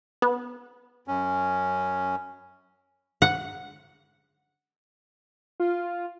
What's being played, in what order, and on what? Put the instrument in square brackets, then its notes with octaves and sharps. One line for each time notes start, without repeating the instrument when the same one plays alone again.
[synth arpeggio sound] B3
[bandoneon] F#2 C#4
[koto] F#5
[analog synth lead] F4